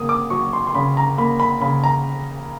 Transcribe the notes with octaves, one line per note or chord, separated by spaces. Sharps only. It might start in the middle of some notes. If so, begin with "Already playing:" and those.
Already playing: C#3 A#3 D#6
D6
F#3 C#6
C6
C6
C#3 B5
A#5
A#3 B5
B5
C#3 B5
A#5